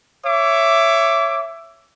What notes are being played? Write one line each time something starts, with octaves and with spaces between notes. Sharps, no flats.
C#5 E5 D6